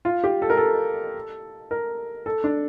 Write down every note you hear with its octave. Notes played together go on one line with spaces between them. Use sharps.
F4
G4
A4
A#4
A4
A#4
A4
D4